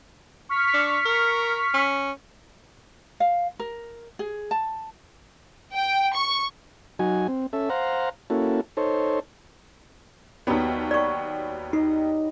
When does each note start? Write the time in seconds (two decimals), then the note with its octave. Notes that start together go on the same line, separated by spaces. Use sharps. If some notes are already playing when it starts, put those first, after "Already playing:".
0.49 C#6 F6 B6
0.74 D4
1.06 A#4
1.74 C#4
3.20 F5
3.59 A#4
4.19 G#4
4.51 A5
5.72 G5
6.13 C#6
6.99 F#3 D#4 F#4 G#5
7.28 C4
7.53 C#4 A4 E5
7.70 C5 F5 F#5 A#5
8.30 A#3 C#4 E4 F#4 A4
8.77 D#4 A4 C5 C#5
10.47 D#2 F#3 G3 B3 F5
10.91 B4 C#5 D5 C#6
11.73 D#4 D#5 D6